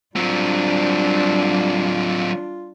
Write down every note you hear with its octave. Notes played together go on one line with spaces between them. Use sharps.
F#3 G3 C4 D4 F4